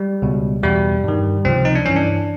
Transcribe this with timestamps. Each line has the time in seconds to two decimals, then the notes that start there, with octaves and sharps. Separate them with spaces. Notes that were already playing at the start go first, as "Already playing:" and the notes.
Already playing: G3
0.22 C#2 B2
0.63 E2 B2 G3
1.04 G2 D#3
1.45 C#2 C3 F3 C4
1.65 D#4
1.75 D4
1.86 G2 E3 C#4
1.96 D4